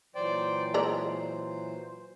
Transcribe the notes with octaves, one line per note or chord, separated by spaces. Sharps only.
A#2 E3 F#3 C5 D5 G5
G#3 C5 D5 A#5